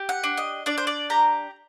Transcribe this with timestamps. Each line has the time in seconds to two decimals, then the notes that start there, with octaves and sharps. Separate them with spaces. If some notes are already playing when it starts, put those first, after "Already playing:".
Already playing: G4
0.09 F#5
0.24 D4
0.37 D#5
0.66 D4 D5
0.78 C5
0.87 D5
1.10 G4 A#5